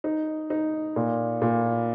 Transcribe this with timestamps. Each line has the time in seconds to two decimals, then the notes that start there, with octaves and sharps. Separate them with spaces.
0.04 D#4
0.50 D#4
0.96 A#2
1.42 A#2